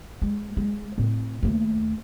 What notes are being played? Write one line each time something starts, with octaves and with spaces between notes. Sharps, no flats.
G#3
G#3
A2 C4
D#2 A3